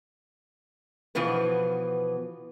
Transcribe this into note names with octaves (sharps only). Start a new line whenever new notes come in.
B2 E3 F3 B3 B4